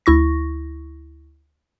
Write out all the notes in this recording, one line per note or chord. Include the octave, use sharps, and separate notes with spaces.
D2 E4 C#6 A#6